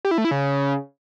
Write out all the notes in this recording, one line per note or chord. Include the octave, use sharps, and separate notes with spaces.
G4
E4
A3
E4
C#3